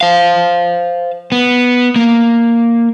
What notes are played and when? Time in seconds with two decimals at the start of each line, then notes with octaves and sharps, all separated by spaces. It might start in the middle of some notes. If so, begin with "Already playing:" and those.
0.01 C5 F5
1.32 B3
1.96 A#3